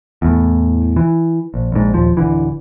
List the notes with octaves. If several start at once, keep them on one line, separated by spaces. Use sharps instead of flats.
E2 A2
E3
A#1
A#1 G#2
D#1 F3
D1 C2 D3 E3